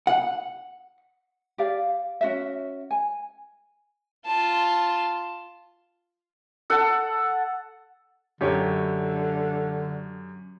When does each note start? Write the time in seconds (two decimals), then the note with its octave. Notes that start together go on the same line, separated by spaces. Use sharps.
0.07 F#5
1.58 G4 D5 F5
2.21 C#4 F#4 E5
2.91 G#5
4.26 F4 A5
6.70 A4 F#5
8.41 F#2 D3 G4 C#5